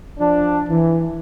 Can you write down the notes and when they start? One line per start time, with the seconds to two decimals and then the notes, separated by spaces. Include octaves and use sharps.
0.19 F3 D4
0.68 E3